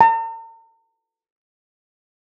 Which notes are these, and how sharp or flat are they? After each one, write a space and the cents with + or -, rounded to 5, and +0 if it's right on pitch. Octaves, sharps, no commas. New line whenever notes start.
A#5 -45